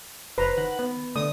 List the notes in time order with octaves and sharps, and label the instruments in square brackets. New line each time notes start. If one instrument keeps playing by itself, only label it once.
[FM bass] F1 [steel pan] B4 A#5 [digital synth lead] C5
[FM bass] D#3 [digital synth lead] F#5
[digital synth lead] B3
[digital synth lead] D3 [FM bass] A3 [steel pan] D#6